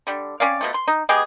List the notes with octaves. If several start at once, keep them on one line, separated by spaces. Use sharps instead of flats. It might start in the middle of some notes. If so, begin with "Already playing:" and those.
D3 G3
C4 C#4 D5 F5
B2 F3 A3
C6
D#4
G#3 B3 G4 G#4